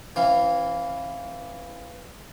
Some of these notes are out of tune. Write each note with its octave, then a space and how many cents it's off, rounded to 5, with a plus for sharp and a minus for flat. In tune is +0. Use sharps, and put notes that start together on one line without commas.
E3 +0 C4 +45 F5 +0